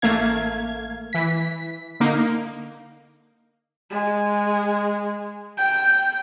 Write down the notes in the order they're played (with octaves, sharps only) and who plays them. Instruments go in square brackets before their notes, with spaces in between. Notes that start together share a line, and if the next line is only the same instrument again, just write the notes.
[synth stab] A1 A3 A#3 F5 G#6
E3 B6
D3 A#3 D#4
[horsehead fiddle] G#3
G5